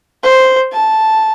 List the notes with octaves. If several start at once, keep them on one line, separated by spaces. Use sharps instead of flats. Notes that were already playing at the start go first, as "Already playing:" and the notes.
C5
A5